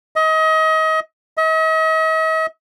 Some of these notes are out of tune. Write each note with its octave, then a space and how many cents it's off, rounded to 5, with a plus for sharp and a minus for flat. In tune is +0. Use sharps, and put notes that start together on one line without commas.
D#5 +30
D#5 +45